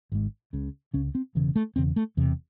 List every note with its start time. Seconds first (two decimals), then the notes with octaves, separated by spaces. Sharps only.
0.12 G#1 G#2
0.53 C#2 C#3
0.94 C#2 C#3 C#4
1.15 C4
1.35 E1 E2 C#3
1.56 A3
1.76 E1 E2 C#3 C4
1.96 A3
2.17 E1 E2 C3